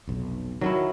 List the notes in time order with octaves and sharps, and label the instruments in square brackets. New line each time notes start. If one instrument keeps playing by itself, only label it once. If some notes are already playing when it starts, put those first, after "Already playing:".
[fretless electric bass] F1 B1
[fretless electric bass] D#3 [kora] F#3 C#4 E4